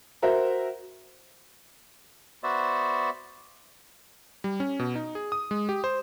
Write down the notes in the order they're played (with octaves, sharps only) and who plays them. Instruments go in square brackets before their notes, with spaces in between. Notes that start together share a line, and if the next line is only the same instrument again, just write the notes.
[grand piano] F#4 A#4 C5 E5
[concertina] B3 F#4 C5 D5 E5
[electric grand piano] G3
C#4
B2
D#4
G#4
D#6
G#3
G4
C5